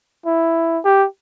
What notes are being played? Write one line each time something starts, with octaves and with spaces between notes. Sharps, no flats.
E4
G4